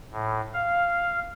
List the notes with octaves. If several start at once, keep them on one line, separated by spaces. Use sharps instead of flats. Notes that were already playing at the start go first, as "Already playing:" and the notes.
A2
F5